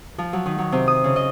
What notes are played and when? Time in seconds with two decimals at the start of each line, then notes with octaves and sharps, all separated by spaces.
0.18 F3
0.33 F#3
0.46 D#3
0.58 F#3
0.72 C3
0.88 D#6
1.04 C#3
1.16 D#5